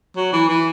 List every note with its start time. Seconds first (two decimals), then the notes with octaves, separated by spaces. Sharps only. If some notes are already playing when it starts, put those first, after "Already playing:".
0.16 F#3
0.33 E3
0.48 E3